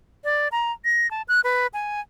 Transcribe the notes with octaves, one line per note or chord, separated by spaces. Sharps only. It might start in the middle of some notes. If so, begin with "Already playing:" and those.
D5
A#5
A#6
A5
F#6
B4
G#5